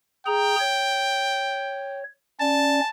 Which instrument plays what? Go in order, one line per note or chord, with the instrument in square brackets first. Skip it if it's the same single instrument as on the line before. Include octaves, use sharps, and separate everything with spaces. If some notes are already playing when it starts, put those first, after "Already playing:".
[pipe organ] G#4 A#5 [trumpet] G5
[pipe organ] C#5
[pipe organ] C#4 D5 [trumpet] A5